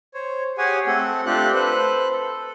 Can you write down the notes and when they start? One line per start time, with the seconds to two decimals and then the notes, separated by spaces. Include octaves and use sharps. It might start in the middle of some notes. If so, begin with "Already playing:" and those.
0.14 C5 C#5
0.58 G4 G#4 C#5 F#5 G#5
0.87 A3 C4 A4 F#5
1.26 A3 C4 D4 F4 G4 F#6
1.54 A4 B4 C5 F#6
2.12 A4